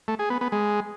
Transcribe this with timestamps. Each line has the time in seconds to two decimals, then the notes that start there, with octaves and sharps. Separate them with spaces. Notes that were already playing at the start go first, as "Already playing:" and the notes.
0.08 A3
0.19 G#4
0.30 B3
0.41 B3
0.52 G#3